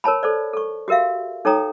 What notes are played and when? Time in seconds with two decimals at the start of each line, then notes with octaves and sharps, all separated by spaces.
0.04 A#4 C#5 A5 B5
0.23 A4 C5 D5
0.53 A4 C#6
0.88 F#4 G4 A#4 E5 F5
1.45 D#4 A4 C#5 G5 A#5 D#6